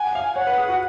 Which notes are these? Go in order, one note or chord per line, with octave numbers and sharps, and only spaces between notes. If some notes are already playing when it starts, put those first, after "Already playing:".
Already playing: F#5 G#5
F5
C#5 F#5
B4
G#4
F#4